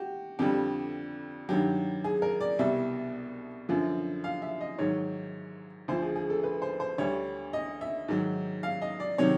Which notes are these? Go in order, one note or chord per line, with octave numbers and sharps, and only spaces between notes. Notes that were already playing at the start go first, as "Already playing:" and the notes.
Already playing: F#4 G4
F2 D3 G3 G4
G2 D#3 F#3 G4
G#4
A#4
D5
C2 B2 G3 E5
F#2 D3 F3
F5
E5
D#5
G#2 D#3 F#3 C#5
D2 D3 F3 C5
G#4
G#4
A4
B4
C5
C5
D2 D3 G3 C#5
D#5
E5
G#2 D#3 F#3
F5
D#5
D5
C3 D#3 F#3 C#5